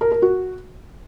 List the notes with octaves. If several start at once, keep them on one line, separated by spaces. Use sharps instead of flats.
A#4
A#4
F#4